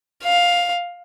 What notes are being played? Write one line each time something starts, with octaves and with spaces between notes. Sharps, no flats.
F5